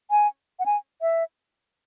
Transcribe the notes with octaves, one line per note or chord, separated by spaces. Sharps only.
G#5
F#5
G#5
E5